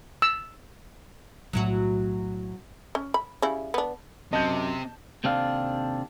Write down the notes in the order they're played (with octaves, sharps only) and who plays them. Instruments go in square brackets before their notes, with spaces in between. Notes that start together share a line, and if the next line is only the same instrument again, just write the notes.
[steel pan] E6
[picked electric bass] B1 A2 A3 [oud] F#3 E4 F#4
[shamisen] C#4
B5
C#3 G3 E4
B3 D4
[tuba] F#2 [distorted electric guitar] C3 [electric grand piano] D#5 [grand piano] A5 G6
[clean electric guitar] D#2 C3 C4 D4 A4 F5